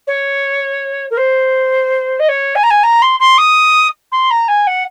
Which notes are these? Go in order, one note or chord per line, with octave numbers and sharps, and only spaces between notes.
C#5
A#4
C5
D#5
C#5
G#5
A#5
G#5
A#5
C6
C6
D#6
C6
A#5
G#5
F#5